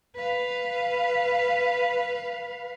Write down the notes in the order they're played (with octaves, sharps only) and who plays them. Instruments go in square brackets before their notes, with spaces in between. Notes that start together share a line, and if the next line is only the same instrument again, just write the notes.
[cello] B4 F5